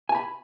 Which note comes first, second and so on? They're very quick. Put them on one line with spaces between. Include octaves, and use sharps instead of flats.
G#5 A5 B5